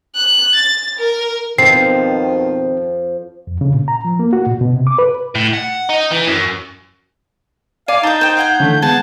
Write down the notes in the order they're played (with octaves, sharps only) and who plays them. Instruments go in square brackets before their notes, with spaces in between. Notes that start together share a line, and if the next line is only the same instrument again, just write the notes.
[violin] F#6
A6
A#4
[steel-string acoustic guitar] F2 F3 [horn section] B2 D#3 [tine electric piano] C4 [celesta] C7
[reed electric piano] F2
C#3
A#2
A#5
F3
A#3
F#4
A#2
B2
C3
D6
B4
[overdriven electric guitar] A2
F#5
D#4
E3
F#2
[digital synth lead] D5 [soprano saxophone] F5 [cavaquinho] G#5
[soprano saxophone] D#4 [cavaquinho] A5 D#6 [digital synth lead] G6
[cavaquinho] C5 G5
F5 F#5 G#5
[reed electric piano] D3 E3 C#4 [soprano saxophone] A3
[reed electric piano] G#3 B3 [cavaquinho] G#4 F#5 G#5 [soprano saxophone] A5